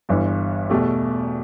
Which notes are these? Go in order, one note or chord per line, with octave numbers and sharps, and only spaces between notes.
G1 G2 E3
E2 B2 A3 G4